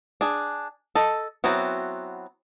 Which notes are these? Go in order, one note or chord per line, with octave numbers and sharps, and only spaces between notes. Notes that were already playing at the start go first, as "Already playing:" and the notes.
D4 G#4
A4 D#5
F#3 B3 C4 E4 F#4